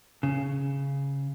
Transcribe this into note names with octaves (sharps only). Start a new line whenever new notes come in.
C#3